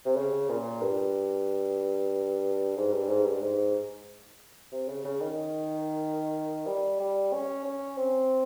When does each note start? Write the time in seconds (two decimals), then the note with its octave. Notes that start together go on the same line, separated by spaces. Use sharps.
0.06 C3
0.16 C#3
0.50 A#2
0.82 G2
2.77 G#2
2.93 G2
3.09 G#2
3.26 G2
3.42 G#2
4.72 C3
4.89 C#3
5.05 C#3
5.21 D#3
6.67 G3
7.00 G3
7.33 C#4
7.64 C#4
7.98 C4